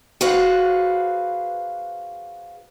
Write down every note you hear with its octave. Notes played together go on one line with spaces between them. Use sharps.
F#4 G#4 B4 C5 F5 F#5